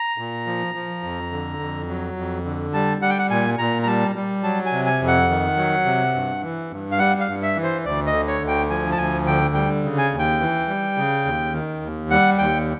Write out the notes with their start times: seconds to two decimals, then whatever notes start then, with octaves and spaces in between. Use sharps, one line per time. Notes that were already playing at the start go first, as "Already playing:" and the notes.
Already playing: A#5
0.18 A#2
0.47 F3
0.75 F3
1.03 F2
1.32 D3
1.59 F2
1.88 F#3
2.17 F2
2.45 D3
2.74 G3 A5
3.02 G3 F#5
3.10 G5
3.19 F#5
3.30 A#2 G#5
3.59 A#2 A#5
3.83 A#5
3.86 G3 A5
4.16 G3
4.43 F#3 A5
4.66 G#5
4.72 C3
4.86 G#5
5.01 F2
5.08 F#5
5.29 D#3
5.57 F#3
5.85 C3
6.15 G2
6.43 E3
6.71 G2
6.92 F5
6.99 G3 F#5
7.20 F5
7.28 G2
7.42 E5
7.56 E3
7.63 C5
7.85 D2 D5
8.07 D#5
8.13 D3
8.28 C#5
8.42 D2
8.48 G5
8.70 F3 G#5
8.92 A5
8.98 D2 G#5
9.27 D3 G5
9.54 G3 G5
9.84 C#3
9.98 G#5
10.12 D#2
10.19 G5
10.40 E3
10.68 G3
10.97 C#3
11.25 D#2
11.53 D#3
11.82 D#2
12.11 G3 F#5
12.38 D#2 G5